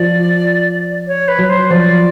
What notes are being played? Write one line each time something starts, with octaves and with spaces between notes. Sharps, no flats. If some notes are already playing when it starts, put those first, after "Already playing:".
Already playing: F3 D5
C#5
B4
F#3
C5
F3 D5